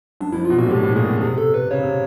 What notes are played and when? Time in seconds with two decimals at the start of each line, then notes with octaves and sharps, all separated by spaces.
0.21 F#2 D4
0.33 F2 E4
0.45 B2 F4
0.58 A#2 F#4
0.66 G#2
0.70 A2 G4
0.83 A2
0.95 A#2 G#4
1.08 B2
1.20 C3 G#4
1.38 A4
1.54 B4
1.71 C#3 C#5
1.83 C3